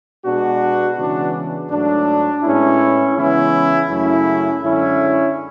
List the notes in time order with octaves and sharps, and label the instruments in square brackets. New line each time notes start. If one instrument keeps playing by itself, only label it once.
[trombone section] B2 G#3 B3 D4 F#4
C#3 E3 G#3 B3 D4 F#4
G#2 F#3 A3 D4
A2 G#3 B3 C#4 E4
C#3 E3 G#3 B3 C#4 E4
F#2 C#3 F#3 A3 C#4 E4
F#2 D3 G#3 C#4 E4